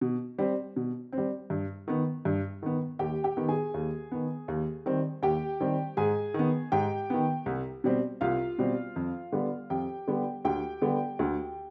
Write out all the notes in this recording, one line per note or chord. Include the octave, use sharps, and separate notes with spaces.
B2
G3 C4
B2
C4
G3
G2
D#3 B3
G2
D#3 B3
D#2 G4 G5
G4 G5
D#3 B3
G#4 G#5
D#2
D#3 B3
D#2
D#3 G3 C4
D#2 G4 G5
D#3 G3 C4
G#2 G#4 G#5
D#3 B3
G#2 G4 G5
D#3 B3
C2
B2 G3 C4
C2 F4 F5
B2 G3 C4
F2
D3 G3 B3
F2 G4 G5
D3 G3 B3
D2 G4 G5
D3 G3 B3
D2